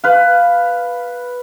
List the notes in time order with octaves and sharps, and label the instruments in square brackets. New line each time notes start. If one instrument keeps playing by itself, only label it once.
[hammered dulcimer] B4 F5